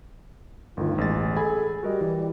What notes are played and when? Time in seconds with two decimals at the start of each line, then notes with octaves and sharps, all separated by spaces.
0.77 G1 D2 D#3 F4
0.98 A1 G#3 A6
1.36 G#4 A4 G#5 B5
1.83 G3 F#4 A#4 D#5
2.01 E3